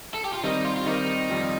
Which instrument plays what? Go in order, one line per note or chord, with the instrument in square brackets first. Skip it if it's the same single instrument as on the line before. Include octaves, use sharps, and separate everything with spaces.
[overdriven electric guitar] A4
G4
F4
[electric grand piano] D#3 G3 C4 G4 A#4 [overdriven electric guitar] D#4
[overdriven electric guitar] F4
F4
[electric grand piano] D#3 G3 C4 G4 A#4 [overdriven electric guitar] D#4
[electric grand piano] F2 D#3 G3 C4 F4